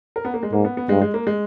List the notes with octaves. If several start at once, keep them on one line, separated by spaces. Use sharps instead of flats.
A#4
B3
A#3
G#3
G#2 A#3
B3
B3
G2 G#3
G#3
A#3
G#3